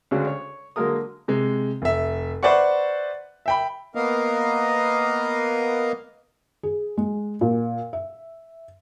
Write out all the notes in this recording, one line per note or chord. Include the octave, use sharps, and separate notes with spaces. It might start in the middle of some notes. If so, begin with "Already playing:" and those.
D2 C#3 G#3 C#4 D4 F#4
C#5
D3 F#3 G#3 A#3 A#4 D#6
C3 G#3
F1 E5
B4 C5 D5 E5 F#5 C#6
E5 G5 B5
A#3 B3 A#4 D#5 F5
G#4
G#3
A#2
E5